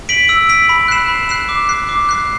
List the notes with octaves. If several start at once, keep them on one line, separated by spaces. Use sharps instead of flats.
B6 D7 F#7
E6
B6 D7 F#7
B5
F#6 C7 E7
B5
F#6 C7 E7
D6
F#6 C7
D6
F#6 C7